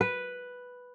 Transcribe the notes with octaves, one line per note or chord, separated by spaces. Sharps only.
B4